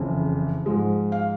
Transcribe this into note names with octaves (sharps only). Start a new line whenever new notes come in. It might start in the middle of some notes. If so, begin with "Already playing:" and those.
Already playing: F#1 F2 C#3 E3
G#2 F3 G#3
F5